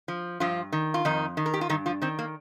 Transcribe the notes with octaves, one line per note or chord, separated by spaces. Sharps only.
F3
G2 F3 F4
D#3
F4
F2 D#3 D#4
D#3
A#4
G4
F4
G2 D#3 D#4
F3 F4
D#3 C4
A#3